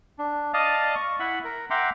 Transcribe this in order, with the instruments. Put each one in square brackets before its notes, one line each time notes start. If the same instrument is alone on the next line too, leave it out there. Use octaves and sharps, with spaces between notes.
[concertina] D4
D5 D#5 F5 A5 D#6
C#6
E4 E5 F#5 B5
A#4
E5 F#5 G5 A#5 C6 D6